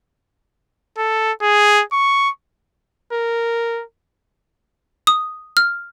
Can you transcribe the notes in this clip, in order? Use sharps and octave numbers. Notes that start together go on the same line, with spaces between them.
A4
G#4
C#6
A#4
D#6
F6